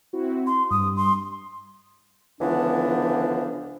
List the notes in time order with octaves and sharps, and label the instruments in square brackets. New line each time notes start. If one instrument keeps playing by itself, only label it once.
[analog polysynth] C4 E4 F#4
[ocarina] C6
[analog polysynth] G2 [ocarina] D#6
[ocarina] C6
[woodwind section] C#2 D3 E3 F3 B3 D4